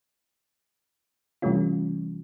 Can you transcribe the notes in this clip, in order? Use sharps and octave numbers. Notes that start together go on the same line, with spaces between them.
C3 E3 G3 A3 C#4 F4